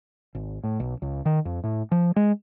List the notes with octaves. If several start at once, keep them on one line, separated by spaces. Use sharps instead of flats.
G#1
A2
B1
C#2
D#3
F2
A2
F3
G#3